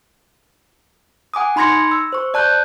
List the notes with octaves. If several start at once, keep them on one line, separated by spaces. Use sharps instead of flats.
F#5 G#5 D6 D#6
D#4 B5 C6 G#6 A#6 C#7
E6
C5 C#6
D5 A5 F#6 G6